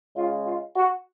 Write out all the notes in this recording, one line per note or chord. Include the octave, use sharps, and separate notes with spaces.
C#3 G#3 F4
F4
F#4